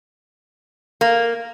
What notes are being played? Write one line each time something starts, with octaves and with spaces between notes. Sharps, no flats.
A#3